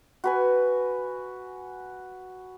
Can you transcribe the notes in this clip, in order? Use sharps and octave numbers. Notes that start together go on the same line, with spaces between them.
F#4 B4 G#5